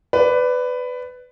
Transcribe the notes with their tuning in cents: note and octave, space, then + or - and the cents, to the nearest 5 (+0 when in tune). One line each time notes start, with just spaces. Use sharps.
B4 +15 D5 -10